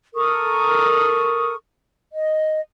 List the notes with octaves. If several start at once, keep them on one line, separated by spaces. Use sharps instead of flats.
A4 A#4 C#6 D#6
D#5